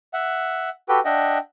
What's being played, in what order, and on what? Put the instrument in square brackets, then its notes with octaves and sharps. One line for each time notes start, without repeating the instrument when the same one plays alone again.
[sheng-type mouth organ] E5 F#5
F#4 G4 A4 B4 G5
D4 D#5 E5 F#5 G5